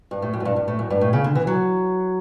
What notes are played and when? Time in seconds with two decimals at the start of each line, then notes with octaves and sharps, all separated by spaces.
0.11 G2
0.22 A2
0.34 F#2
0.40 A2
0.45 G2
0.56 G2
0.68 A2
0.79 F#2
0.90 G2
1.01 A2
1.13 C#3
1.24 D3
1.35 E3
1.47 F#3